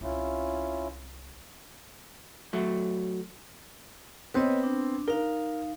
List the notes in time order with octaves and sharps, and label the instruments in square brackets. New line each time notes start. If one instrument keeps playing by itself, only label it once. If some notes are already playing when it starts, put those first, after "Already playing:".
[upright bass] C2 [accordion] C#4 E4 F4
[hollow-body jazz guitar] F#3 A3
[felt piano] B3 C4 [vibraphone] B4 C#5 D#5
[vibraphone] D4
[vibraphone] D#4 F5 [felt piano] A#4